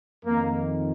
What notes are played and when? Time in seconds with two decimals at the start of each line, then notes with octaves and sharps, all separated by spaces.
0.25 F2 D#3 A#3